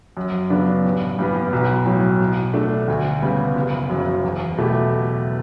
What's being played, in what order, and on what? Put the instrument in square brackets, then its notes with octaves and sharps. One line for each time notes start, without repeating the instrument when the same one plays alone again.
[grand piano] F#2
C#3 F#3 B3 D4
A1
G2 E3 G3 B3
B1
A2 F#3
B2
A3 D4
D2
C#3 G3 B3
F#1
F#2 C#3 F#3
E2
B2 A3 E4 G4